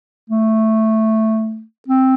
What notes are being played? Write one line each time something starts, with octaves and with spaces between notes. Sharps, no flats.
A3
C4